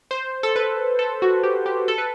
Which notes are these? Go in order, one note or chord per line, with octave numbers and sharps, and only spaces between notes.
C5
A4
B4
A4
F#4
G4
G4
A4
B4